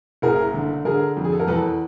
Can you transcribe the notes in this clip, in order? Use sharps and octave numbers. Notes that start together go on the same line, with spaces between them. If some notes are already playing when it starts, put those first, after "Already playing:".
F#1 G#4 A#4
D3
D3 G#4 A#4
F2
G#4
A4
A#4
E2 A4 B4